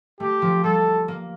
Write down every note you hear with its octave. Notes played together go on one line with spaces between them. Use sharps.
A3 G4
F3
G3 A4
A#3